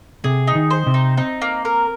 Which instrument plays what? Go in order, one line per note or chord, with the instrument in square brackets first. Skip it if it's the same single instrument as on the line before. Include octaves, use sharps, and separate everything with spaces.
[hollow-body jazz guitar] C3 [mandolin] G#4
[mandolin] D#4
[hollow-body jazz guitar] D#3
[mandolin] C5
[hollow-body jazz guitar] C3
[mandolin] D#4
[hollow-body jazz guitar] C4 [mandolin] D#4
[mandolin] A#3
A#4